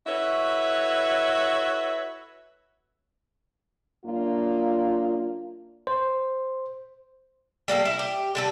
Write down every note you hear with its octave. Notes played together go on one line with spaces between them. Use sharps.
E4 F#4 A4 B4 C#5 E5
F#2 A#3 D4 F4
C5
G3 A#3 D4 A4
E4
G4
D3 G3 A4